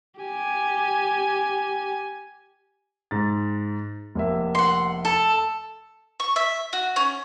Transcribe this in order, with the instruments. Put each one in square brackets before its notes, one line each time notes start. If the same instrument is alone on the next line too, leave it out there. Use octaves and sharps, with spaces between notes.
[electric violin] G4 G#5
[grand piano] G#2 A6
F1 A#3 E5
[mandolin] F#5 C6
A4
C#6
E5
F#4
C#4